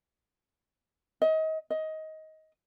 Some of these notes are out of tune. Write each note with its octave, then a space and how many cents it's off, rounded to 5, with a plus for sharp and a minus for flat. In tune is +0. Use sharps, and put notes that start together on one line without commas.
D#5 +30
D#5 +20